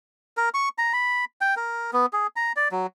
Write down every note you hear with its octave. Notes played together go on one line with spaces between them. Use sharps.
A#4
C#6
A#5
B5
G5
A#4
B3
G#4
A#5
D5
F#3